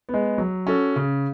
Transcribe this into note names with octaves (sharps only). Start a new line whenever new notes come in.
B3
G#3
F#3
C#4 F#4 A4
C#3